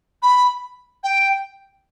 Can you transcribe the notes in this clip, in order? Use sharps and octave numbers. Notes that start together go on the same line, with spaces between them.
B5
G5